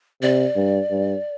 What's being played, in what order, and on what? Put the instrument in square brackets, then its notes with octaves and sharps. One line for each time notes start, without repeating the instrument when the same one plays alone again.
[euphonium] C3 [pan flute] D5
[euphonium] G2
G2